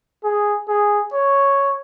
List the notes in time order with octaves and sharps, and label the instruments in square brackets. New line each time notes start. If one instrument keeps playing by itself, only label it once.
[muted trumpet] G#4
G#4
C#5